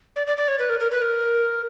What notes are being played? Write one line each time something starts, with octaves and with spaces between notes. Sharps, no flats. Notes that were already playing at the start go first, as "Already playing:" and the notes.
D5
D5
D5
C#5
B4
A#4
A#4
B4
A#4